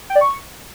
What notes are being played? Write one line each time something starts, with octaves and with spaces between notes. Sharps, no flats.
G5
D5
C#6